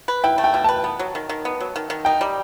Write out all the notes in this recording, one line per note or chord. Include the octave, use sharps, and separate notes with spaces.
B4
E4 G5
A3
G5
B2
B4 A5
B3
F#3
D#3
D#3
B3
F#3
D#3
D#3
D#4 G5
G3